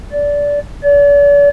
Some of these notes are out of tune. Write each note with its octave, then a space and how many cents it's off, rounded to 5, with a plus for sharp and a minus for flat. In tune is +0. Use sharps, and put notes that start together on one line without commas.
D5 -20
D5 -45